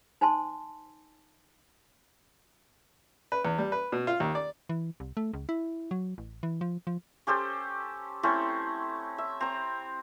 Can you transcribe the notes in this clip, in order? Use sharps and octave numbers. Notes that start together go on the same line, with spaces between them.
D#4 C5 G#5 A5 C6
B4
E2
G3
B4
B2
F4
D#2
D5
E3
C2
A3
C#2
E4
F#3
A1
E3
F3
F3
C#4 G4 A4 C5
A3 C4 C#4 E4
E5
C4 A#5